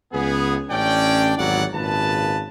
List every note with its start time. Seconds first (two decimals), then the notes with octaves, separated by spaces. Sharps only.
0.13 C#2 B3 G#4
0.70 A1 C#4 D4 D5 G5
1.38 G#1 E2 F#3 G3 D5 F#5
1.74 G#1 A#2 C#3 B4 A5